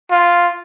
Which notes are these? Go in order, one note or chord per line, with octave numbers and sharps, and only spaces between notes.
F4